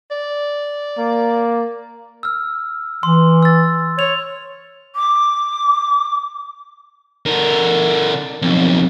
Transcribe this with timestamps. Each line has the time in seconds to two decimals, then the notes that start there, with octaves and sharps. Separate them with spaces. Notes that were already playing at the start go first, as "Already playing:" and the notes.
0.11 D5
0.98 A#3
2.23 E6 F6
3.03 E3 C6
3.43 E6 A6
3.99 C#5 F7
4.95 D6
7.26 D3 A#4
8.42 B1 F2